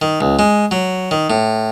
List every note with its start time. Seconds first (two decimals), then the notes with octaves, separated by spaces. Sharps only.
0.02 D#3
0.21 C#2
0.39 G#3
0.71 F#3
1.11 D#3
1.30 A2